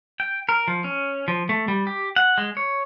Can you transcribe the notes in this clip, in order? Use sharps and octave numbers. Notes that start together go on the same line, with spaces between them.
G5
A#4
F3
C#4
F3
A3
G3
G4
F#5
G#3
C#5